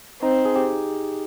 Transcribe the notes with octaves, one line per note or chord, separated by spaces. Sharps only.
C4 D#4
G#4
G4